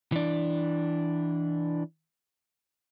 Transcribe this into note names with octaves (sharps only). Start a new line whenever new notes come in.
E3 D4